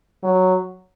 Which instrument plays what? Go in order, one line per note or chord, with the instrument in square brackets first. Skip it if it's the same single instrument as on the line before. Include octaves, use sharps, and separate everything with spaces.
[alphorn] F#3